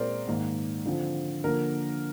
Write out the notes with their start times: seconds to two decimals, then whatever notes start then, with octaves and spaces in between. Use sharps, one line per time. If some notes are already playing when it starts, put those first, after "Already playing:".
Already playing: A#2 G#3 C4 A#4 C5 D5
0.27 G#2 D#3 A#3
0.86 D3 F3 C4
1.44 D3 F3 A#3 A#4